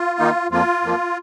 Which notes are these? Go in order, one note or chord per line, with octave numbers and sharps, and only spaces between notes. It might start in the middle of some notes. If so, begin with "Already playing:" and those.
Already playing: F4
D#3 A#3 D#4
F2 F3 A#3 F4
F2 F3 A#3